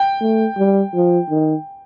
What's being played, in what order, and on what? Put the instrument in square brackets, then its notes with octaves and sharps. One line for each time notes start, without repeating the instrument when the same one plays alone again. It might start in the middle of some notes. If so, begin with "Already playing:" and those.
Already playing: [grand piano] G5
[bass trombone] A3
G3
F3
D#3